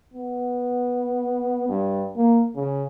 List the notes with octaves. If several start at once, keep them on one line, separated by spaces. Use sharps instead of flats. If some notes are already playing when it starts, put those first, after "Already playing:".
B3
G2
A#3
C#3